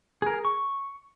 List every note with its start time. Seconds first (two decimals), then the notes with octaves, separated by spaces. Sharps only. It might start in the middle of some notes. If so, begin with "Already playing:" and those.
0.22 G#4 A#4
0.45 C#6